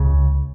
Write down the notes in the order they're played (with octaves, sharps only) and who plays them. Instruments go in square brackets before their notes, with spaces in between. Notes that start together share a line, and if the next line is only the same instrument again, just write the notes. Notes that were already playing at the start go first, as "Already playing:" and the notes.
Already playing: [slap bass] C#2 C#3